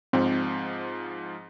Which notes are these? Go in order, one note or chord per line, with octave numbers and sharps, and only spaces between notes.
G#2 F3 C4